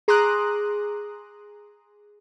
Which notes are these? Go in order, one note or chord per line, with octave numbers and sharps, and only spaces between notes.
G#4 A#5 C6 D6 D#6 F#6